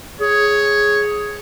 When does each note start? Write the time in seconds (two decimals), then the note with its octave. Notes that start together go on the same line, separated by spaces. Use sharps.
0.21 G#4 C#5